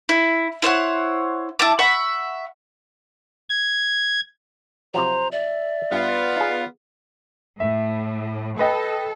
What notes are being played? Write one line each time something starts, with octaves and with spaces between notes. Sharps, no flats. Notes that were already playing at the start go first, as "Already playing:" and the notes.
E4
E4 C5 C#5 F#5
E4 A5 D6
E5 F#5 B5 C#6
G#6
C3 F3 F#3 C5 A#5
D5 E5
G2 B3 F4
D#4 G#4 F5
A2 E5
A4 B4 D#5 G5